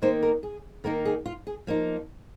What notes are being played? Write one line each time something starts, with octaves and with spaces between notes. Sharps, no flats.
D#3 A#3 D#4 C5
A#4
G#4
D#3 A#3 D#4 A#4
G#4
F4
G#4
F3 A#3 D#4